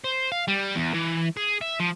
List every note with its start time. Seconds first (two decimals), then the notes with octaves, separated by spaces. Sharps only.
0.04 C5
0.32 F5
0.48 G3
0.75 E2
0.94 E3
1.37 G#4
1.61 E5
1.80 F3